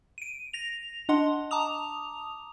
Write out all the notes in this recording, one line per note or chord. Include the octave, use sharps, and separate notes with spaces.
D7 D#7
A#6 F7
D4 D#5 F#5 C6
A5 A#5 D6 D#6 F7